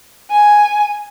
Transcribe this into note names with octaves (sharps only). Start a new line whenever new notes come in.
G#5